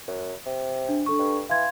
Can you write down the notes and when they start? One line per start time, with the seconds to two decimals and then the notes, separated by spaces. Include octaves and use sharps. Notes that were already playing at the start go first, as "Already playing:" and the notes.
0.07 F#2
0.46 C3
0.89 D4
1.06 D4 A4 C#6
1.19 G2
1.49 E3 F5 C6 G#6